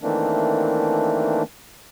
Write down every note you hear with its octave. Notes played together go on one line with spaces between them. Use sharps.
D#3 E3 A3 A#3 C4 D4